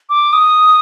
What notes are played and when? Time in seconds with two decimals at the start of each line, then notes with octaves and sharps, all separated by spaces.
0.10 D6
0.33 D#6